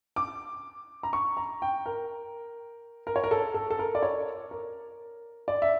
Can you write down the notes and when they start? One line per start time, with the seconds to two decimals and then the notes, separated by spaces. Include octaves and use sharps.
0.16 D6
1.03 A#5
1.13 C#6
1.37 A#5
1.62 G5
1.86 A#4
3.07 A#4
3.16 C#5
3.24 A#4
3.31 A4
3.54 A4
3.70 A4
3.79 A#4
3.95 D5
4.03 C#5
4.51 A#4
5.48 D5
5.62 E5